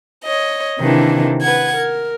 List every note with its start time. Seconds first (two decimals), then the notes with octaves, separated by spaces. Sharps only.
0.24 C#5 D#5
0.80 C3 D#3 E3 A#3 D4
1.41 B4 F#5 G#6
1.76 A#4